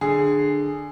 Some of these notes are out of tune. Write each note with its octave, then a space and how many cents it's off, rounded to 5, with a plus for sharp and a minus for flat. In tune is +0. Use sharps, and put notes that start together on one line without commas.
D3 +15 G#4 +0